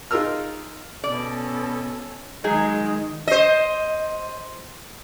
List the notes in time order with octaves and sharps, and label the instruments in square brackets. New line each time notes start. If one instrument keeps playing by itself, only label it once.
[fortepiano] D#4 F4 G#4 A#4 E6 F6
[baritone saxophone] B2 [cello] C#4 A4 [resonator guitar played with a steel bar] D5
[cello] D#3 [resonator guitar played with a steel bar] F#3 D#4 G#4 [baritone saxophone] G#3
[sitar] C5 D#5